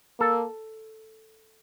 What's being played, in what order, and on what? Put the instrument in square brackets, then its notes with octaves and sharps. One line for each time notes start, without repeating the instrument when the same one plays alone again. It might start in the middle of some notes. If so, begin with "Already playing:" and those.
[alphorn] A#3 [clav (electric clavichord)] A4